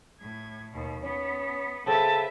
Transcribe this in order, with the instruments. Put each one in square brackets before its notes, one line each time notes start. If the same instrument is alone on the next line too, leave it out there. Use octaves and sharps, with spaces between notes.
[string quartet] A2 G#6
D#2 B2
[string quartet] B3 [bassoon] C#4
[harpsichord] C#3 C4 [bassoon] A4 [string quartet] B4 E5 [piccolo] A5